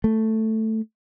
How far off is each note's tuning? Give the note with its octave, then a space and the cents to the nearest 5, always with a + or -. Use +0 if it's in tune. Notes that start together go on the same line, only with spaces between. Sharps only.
A3 +5